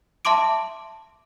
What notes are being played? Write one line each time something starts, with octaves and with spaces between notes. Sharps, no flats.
E5 A5 C6 D6 D7